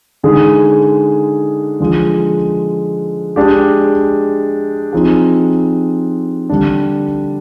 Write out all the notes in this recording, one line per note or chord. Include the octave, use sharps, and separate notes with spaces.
D3 G#3 D#4 G#4
D3 F3 G#3
G#3 D4 G4
F3 C4 D#4 G#4
D3 G3 D4